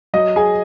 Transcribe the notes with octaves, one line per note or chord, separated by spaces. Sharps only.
F#3 D#5
G#4 G#5